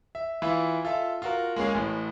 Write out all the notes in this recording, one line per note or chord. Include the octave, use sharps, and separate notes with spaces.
E5
E3 E4 F4
F4 A4 E5
F4 F#4 A#4
G#3 A#3 C#4 G#4
A1 A2